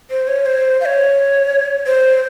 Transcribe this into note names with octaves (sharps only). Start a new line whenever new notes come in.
C5
C#5
C5
F5
C#5
C5